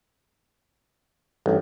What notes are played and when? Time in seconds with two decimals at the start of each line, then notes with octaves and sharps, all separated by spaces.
1.46 A1 G2 E3